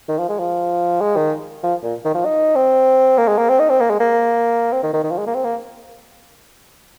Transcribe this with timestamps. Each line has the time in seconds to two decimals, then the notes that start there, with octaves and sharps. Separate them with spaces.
0.08 D#3
0.18 F3
0.29 G#3
0.39 F3
1.01 G#3
1.16 D#3
1.63 F3
1.83 A#2
2.05 D#3
2.15 F3
2.25 D#4
2.56 C4
3.18 A#3
3.28 G#3
3.38 A#3
3.49 C4
3.59 D#4
3.70 C4
3.80 A#3
3.90 G#3
4.00 A#3
4.72 C4
4.83 D#3
4.93 D#3
5.04 D#3
5.11 F3
5.18 G#3
5.27 A#3
5.34 C4
5.44 A#3